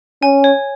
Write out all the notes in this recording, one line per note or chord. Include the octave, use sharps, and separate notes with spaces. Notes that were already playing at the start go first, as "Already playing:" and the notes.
C#4 G#5
C#5